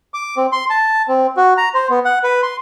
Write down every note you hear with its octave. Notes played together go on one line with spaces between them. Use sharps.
D6
C4
C6
A5
C4
F#4
A#5
C5
B3
F#5
B4
C6